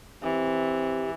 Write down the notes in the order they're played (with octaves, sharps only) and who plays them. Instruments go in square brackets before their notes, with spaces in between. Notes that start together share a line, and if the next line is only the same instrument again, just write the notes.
[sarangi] E3 [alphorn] C4 [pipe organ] G4